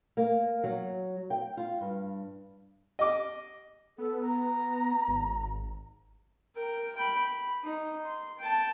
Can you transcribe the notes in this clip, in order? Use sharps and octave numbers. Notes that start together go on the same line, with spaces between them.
A#3
F#3
G5
F4
G2
D#5 D6
B3 A4
A#5
G#1
A#4 G5
G5 B5
B5
D#4
C6
G5 A5